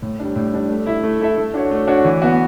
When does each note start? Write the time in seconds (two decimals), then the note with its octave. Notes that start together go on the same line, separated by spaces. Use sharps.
0.02 A2
0.19 G3 D4
0.36 A2
0.53 G3 D4
0.70 A3
0.86 E4 A4 E5
1.04 A3
1.21 E4 A4 E5
1.37 A3
1.54 D4 F#4 C#5
1.71 A3
1.88 D4 F#4 C#5
2.05 E3
2.22 B3 F#4